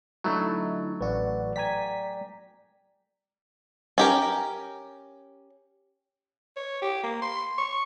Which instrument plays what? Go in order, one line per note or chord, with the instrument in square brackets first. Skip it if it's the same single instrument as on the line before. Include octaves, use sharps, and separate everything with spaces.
[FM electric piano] D3 D#4 E4 [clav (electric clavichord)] F#3 A3
[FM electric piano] A1 F#4 [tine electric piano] B4 D5 F#5
[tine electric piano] D5 G5 A#5 [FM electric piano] G#5 B6
[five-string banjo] C#4 G4 A#4
[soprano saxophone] C#5
G4
A#3
C6
C#6